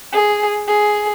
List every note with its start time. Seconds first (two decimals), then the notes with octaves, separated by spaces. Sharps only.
0.13 G#4
0.67 G#4